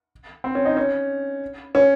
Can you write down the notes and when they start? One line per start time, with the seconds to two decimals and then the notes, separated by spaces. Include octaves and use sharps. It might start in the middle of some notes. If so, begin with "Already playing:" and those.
0.44 C4
0.55 C#4
0.65 D#4
0.77 C#4
1.75 C#4